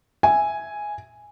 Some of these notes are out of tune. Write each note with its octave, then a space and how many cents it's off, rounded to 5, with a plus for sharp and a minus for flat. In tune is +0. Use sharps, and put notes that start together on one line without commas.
E5 +0 G#5 +0